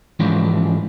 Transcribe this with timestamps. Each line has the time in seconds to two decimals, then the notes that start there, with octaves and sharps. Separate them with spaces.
0.19 G#2 E3 F3 G#3 C#4 D4